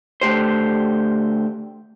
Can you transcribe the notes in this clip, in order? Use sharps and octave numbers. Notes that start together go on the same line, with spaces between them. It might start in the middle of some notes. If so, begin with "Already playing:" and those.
D3 A3 G4 C5